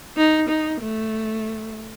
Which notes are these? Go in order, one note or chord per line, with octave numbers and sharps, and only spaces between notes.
D#4
D#4
A3